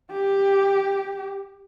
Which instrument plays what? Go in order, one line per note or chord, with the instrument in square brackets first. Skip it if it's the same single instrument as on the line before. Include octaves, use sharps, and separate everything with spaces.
[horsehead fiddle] G4